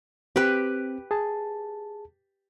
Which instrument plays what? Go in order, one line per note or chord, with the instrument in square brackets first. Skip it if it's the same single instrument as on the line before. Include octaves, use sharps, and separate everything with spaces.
[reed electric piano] C4 [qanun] G4 B4
[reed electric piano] G#4 A5